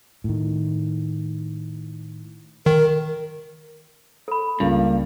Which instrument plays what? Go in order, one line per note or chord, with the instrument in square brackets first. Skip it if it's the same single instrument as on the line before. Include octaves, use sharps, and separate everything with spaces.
[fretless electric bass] A2 D#3
[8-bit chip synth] D#3 [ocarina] A#4
[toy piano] A4 B5
[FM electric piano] C#2 [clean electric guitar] G2 [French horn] A#3